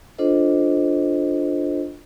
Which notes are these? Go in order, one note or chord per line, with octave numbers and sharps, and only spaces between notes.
D4 F4 A4 C5 D#5